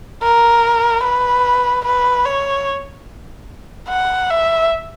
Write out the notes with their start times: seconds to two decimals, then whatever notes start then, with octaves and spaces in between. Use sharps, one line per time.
0.22 A#4
1.03 B4
1.85 B4
2.26 C#5
3.89 F#5
4.30 E5